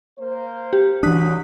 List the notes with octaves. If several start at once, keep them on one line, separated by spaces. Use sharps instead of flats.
A#3 C5
G4
C2 E3 F#3 D4 D#6 F#6 B6